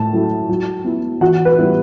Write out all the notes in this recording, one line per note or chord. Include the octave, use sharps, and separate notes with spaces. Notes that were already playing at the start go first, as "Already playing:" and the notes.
Already playing: A2 A5
F#3 A3 E4
F#3
B3 E4
E3 F#4 F#5
B4
G3 B3 E4